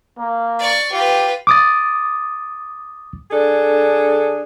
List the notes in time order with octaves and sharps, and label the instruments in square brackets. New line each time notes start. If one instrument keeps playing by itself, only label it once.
[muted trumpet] A#3
[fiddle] D5 C#6
[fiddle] F4 B4 [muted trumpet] G4
[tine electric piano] D6 D#6 A6
[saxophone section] D3 D4 G#4 A4